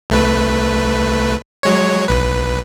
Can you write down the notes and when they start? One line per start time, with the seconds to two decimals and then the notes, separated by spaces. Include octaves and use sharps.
0.10 C2 A3 B4
1.63 F#3 G#3 C#5
2.08 B1 B4